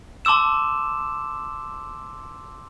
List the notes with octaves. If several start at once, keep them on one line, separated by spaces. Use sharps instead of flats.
A5 C6 D6 E6 E7